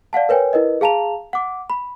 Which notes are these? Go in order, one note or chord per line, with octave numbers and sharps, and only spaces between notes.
D5 F5 F#5 A5
A#4 B4 C#5 G5 G#5
E4 A#4 B4 D#5
G#4 F5 A5 A#5 F7
F#5 D6
B5